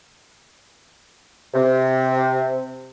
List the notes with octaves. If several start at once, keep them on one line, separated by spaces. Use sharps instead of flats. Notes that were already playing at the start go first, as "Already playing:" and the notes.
C3